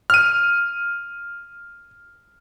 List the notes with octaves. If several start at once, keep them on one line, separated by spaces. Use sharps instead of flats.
F6 D#7